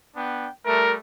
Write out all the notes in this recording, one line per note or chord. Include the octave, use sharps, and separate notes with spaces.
B3 D4 G5
G3 A3 A#4